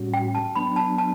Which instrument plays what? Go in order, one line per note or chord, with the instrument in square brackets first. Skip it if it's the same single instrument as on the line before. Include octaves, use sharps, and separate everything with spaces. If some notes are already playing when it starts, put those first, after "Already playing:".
Already playing: [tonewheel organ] A2 G3 C#4 F#4
[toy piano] G5
A5
[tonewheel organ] F#3 B3 D4 [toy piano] B5
[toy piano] A5
A5